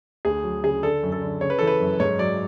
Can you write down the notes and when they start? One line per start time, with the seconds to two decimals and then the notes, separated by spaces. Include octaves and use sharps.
0.25 D2 G#4
0.44 F#3
0.63 C#3 G#4
0.83 D3 A4
1.03 F#2
1.12 A4
1.22 D3
1.41 C#3 C#5
1.50 B4
1.59 E3 A4
1.67 B4
1.80 F#2
2.00 G#2 C#5
2.19 F#3 D5